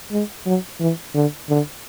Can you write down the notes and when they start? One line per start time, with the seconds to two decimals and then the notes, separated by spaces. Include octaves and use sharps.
0.11 G#3
0.46 F#3
0.80 E3
1.14 D3
1.49 D3